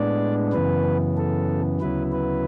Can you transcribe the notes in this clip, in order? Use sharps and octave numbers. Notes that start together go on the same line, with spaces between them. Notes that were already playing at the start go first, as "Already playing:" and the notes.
Already playing: A2 G#3 B3 D4 D5
F#2 C#3 E3 B3 B4
A4
D2 C#3 F#3 B3 E4 B4
B4